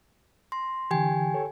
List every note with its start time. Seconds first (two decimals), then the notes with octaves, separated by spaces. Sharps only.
0.52 C6 A#6
0.91 D3 E3 G4 G5 G#5
1.34 A4 C#5